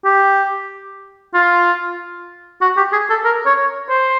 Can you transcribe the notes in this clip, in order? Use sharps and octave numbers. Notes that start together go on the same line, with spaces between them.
G4
F4
F#4
G4
G#4
A4
A#4
C#5
C5